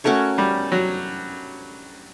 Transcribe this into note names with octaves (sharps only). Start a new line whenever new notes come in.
A3 C#4 F#4 A#4 C#5
G3
F#3